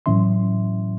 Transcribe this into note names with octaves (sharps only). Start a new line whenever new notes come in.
A2 E3 F#3 C#4 E5 C6